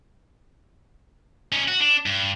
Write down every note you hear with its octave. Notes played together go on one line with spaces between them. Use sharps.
C#4 D#4
F#4
D4
G2